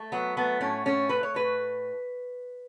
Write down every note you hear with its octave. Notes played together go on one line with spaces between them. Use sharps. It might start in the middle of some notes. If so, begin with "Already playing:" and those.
Already playing: A3
F#3 B3
A3 B3
A2 C#4
A3 C#4
A3 B4
C#5
A2 B4